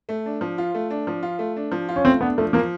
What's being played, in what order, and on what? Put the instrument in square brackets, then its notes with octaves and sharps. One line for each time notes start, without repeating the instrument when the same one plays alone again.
[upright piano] A3
D4
F3
F4
A3
D4
F3
F4
A3
D4
F3
F4
[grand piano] C#4
[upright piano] A3 [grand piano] C4
[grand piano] B3 [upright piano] D4
[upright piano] F3 [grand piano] A3
[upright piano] F3 [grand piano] A#3